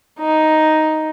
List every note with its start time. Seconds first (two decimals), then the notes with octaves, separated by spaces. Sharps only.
0.20 D#4